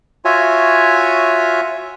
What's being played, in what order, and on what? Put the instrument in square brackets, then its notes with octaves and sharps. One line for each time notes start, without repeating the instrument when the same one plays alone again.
[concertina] F4 F#4 C#5 E5 G#5